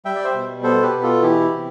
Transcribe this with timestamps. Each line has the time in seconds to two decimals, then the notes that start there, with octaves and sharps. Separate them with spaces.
0.05 G3 E5 G5
0.16 D5
0.24 C5 E5
0.34 B2
0.63 B3 A4 C5
0.83 G4 B4
0.92 B2
1.03 F4 A4
1.22 E3 E4 G4
1.51 C3